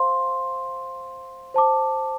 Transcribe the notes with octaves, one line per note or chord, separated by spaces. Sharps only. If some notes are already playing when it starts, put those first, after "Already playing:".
Already playing: C5 F5 C6
C5 A5 D6